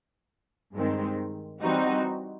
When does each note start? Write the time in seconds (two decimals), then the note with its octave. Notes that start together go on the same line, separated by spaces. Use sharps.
0.73 G2 D#3 G#3 C4
1.61 E3 G3 C4 D#4 F#4